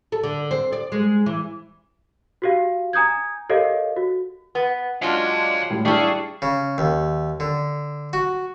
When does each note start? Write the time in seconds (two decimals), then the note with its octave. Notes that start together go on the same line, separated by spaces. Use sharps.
0.12 A4
0.23 D3
0.51 C4
0.73 D5
0.92 G#3
1.26 E3
2.42 F#4 G4 F5
2.93 G#5 A#5 D#6 G6 G#6
3.49 G4 A4 A#4 C#5 D#5 F5
3.96 F#4
4.55 B3
5.02 F#3 G#3 C#4 D4 F4 F5 G5
5.70 A2 G3
5.85 G3 D4 E4 G4 G#4 F5 A5 C#6
6.42 C#3
6.78 D#2
7.40 D3
8.13 F#4